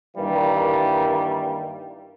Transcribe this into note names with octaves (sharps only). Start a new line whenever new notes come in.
G2 D#3 E3 G3 A#3